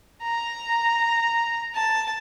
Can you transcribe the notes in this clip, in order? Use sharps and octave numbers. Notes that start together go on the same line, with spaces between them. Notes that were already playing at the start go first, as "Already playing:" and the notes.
A#5
A5